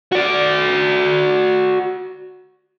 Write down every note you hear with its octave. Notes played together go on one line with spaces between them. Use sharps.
F#4 D5